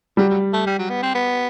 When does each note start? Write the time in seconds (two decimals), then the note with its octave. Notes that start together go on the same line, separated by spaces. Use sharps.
0.17 F#3 G3
0.30 F#3
0.53 A3
0.67 G3
0.79 F#3
0.90 B3
1.03 C4
1.15 B3